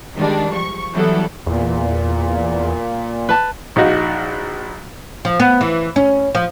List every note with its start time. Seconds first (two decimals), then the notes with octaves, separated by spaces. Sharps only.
0.16 D#3 G3 G#3 D4
0.51 F3 C#6
0.94 E3 F#3 G3 B3 E4 A4
1.47 E2 A#2
3.29 B4 A5
3.76 A#1 F3 D#4 F#4
5.25 F3
5.40 B3
5.61 E3
5.96 C#4
6.35 F3